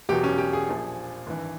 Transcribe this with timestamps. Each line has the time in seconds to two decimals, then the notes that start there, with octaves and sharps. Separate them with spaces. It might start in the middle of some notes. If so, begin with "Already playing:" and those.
0.09 E1 E2 B2 F#3 G4
0.24 C#4
0.38 G4
0.53 G#4
0.69 A#1 A#2 F3
1.26 G#1 G2 E3